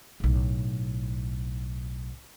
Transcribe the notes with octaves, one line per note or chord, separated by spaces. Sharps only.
B1 A2